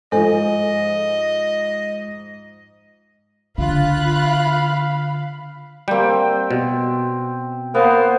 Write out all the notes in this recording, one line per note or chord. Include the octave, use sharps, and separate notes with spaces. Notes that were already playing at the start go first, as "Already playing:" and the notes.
G#2 F3 A4 C5 D#5 G#5
D3 F4 F5 B5 F#6
G3 A#3 C4 G5
B2
A#3 B3 C5